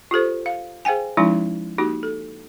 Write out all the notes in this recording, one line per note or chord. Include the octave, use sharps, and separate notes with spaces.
F4 G4 A4 C5
F5
G#4 C5 F5 G5 G#5
F3 G#3 C#4 D#4 E4
A#3 D#4 F#4 G4
A4